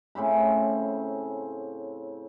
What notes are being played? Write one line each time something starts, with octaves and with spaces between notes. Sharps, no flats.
A2 C#3 C4 B5